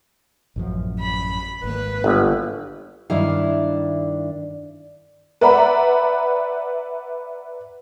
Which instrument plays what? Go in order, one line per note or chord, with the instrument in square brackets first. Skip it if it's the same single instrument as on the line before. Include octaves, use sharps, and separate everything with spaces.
[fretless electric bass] A1 F#2 F3
[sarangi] B5
[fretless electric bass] G#1 A#3 [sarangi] B4
[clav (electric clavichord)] G1
[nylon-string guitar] G2 D#3 D4 E4 F5
[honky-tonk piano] B4 D5 E5 F#5 A#5 B5